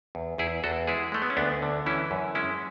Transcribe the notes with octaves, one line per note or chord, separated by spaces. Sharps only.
E2
E2 E4 G#4
E2 F#4 A4
G#3 E4 G#4
G#3 A3
B3
C#4
D2 B3 D4
D3
E3 C#4 E4
F#2
G#3 C#4 E4